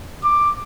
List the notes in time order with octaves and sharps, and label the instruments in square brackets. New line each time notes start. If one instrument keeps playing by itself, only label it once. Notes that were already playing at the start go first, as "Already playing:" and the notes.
[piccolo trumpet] D6